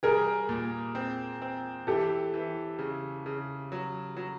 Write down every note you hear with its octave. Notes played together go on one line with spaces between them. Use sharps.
G3 G#4 A#4
A#2
C4
C4
E3 G4 A4
E3
C#3
C#3
F#3
F#3